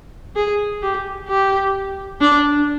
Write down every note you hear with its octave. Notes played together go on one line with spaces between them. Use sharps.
G#4
G4
G4
D4